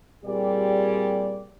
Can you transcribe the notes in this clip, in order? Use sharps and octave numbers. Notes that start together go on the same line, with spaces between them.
A#2 G3 C4 G4 G#4 D5